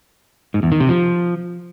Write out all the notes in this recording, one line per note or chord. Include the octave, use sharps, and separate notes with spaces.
G#2
E2
D#3
C3
F3